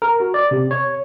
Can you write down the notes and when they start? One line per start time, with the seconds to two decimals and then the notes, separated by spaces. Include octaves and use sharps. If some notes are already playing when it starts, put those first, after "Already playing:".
0.02 A#4
0.20 F#4
0.34 D5
0.51 C3
0.71 C#5